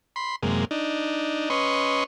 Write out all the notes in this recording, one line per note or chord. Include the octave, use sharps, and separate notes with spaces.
B5 C6
F#2 C3 G#3 A#3
D4 D#4
C#4 B4 D#5 C6 C#6